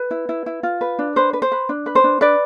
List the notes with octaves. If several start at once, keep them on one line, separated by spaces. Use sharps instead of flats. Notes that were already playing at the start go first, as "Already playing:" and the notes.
Already playing: B4
E4
E4
E4
F4
B4
D4
B4 C5
B4
C5
B4
D4
B4
C5
D4
D4 B4 D5